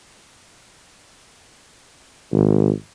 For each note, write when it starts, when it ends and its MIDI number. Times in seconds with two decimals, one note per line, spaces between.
2.32 2.70 32